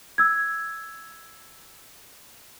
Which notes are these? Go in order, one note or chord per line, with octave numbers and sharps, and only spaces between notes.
E6 G#6